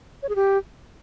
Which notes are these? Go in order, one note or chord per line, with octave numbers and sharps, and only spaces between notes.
C#5
G#4
G4